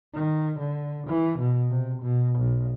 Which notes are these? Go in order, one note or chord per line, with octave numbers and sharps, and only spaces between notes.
D#3
D3
E3
B2
C3
B2
B1